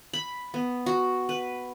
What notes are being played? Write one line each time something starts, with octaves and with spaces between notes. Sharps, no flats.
B5
B3
F#4
B4